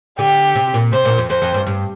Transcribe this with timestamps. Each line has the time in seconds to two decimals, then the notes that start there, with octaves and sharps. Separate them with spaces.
0.18 D3 G4
0.55 C3
0.74 A#2
0.93 C3 C5
1.05 A#2
1.18 F2
1.30 F2 C5
1.42 F2
1.54 G2
1.67 G2